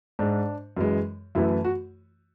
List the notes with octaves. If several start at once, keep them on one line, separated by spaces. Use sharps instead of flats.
G#2 G#3 D4
F#2 E3 G#3
F#2 E3 A3 E4
F#4